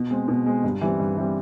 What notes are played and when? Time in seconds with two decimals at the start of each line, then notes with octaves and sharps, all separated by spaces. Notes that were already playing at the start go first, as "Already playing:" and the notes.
Already playing: B2
0.11 G#3 C4
0.28 B2
0.46 G#3 C4
0.63 G2
0.81 E3 G3 C4
0.99 G2
1.17 E3 G3 C4